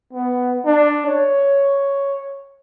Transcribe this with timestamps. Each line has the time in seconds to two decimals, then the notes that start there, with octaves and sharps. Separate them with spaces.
0.14 B3
0.65 D4
1.06 C#5